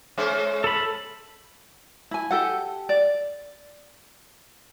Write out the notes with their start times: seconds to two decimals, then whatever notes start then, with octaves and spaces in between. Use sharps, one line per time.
0.18 G#3 C#4 C5
0.64 A4 B5
2.11 E4 G#5
2.31 G4 A4 F#5
2.89 D5